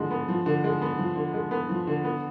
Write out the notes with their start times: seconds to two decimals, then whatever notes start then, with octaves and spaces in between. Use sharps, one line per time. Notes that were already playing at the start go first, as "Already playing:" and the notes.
Already playing: D3 F3 G#3
0.11 B3
0.28 F3
0.46 D3
0.64 G#3
0.82 B3
0.99 F3
1.16 D3
1.34 G#3
1.51 B3
1.69 F3
1.87 D3
2.04 B3